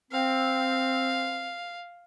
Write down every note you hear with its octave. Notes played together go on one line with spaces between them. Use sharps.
C4 F5